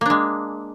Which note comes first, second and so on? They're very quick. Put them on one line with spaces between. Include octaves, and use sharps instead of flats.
A#3 D4 G#3